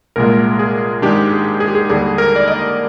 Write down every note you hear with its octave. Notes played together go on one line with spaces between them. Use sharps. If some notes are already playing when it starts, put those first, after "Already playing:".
C2 A#2 G#3 A#4
G#4
G#2 D#3 G#3 D4 G4
G#4
G#4
G4
G#4
D#2 D3 G3 G#4
A#4
D5
D#5